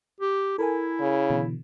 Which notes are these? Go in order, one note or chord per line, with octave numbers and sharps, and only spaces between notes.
G4
E4 A4 A#4 G#5
C#3
B2 D3 E3